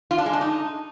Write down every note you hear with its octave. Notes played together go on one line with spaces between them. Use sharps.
F4
D4
G#3
D4
D#4